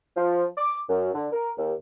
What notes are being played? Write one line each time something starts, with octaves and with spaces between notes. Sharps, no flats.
F3
D6
F#2
D3
A#4
D#2